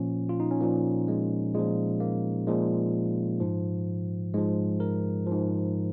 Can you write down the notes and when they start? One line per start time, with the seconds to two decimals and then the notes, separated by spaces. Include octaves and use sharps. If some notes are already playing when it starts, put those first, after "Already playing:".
Already playing: A#2 F3 C#4
0.29 F4
0.40 D#4
0.51 C#4
0.61 A#2 F3 A#3
1.08 G#3
1.54 A#2 F3 G#3
2.00 A#3
2.47 A#2 F3 G#3
3.40 G#2 F3
4.34 G#2 F3 G#3
4.80 A#4
5.27 G#2 F3